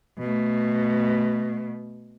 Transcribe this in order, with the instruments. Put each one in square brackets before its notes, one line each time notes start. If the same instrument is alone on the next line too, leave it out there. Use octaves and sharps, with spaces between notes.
[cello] B2 A3